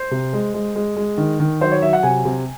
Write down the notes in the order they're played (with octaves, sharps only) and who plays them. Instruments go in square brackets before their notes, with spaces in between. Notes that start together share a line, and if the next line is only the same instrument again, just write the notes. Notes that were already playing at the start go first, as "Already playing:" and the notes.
Already playing: [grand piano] C5
C3
G#3
G#3
G#3
G#3
D#3
D#3
F#3 C5
C#5
F#3 E5
F#5
C3 G#5
C3